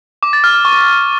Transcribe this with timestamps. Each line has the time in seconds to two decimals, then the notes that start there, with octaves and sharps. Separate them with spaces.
0.23 D6
0.33 A6
0.44 F6
0.54 F6
0.65 C#6